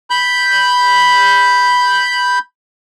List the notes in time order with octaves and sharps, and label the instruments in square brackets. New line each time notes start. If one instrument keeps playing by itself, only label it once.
[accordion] B5 G6